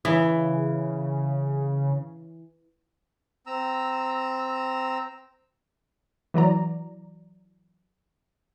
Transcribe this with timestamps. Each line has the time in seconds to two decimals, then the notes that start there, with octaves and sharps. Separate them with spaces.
0.05 C#3 E3
3.47 C4 A#5 E6
6.34 E3 F#3 D5 A#5